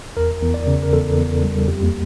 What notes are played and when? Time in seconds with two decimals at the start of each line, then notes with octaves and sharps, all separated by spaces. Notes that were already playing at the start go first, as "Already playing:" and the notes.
0.16 E2 A#4
0.42 E2
0.54 D5
0.67 C#3
0.83 A#4
0.93 E2 A4
1.18 E2
1.44 G3
1.68 F2 G4
1.83 A#3